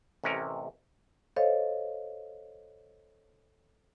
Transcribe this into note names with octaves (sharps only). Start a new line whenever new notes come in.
A1 C3 C#4 A#4
A4 C5 C#5 D#5 F5